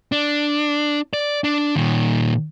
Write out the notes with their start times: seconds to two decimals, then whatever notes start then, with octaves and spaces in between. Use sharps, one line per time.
0.12 D4
1.13 D5
1.44 D4
1.76 A#2 D#3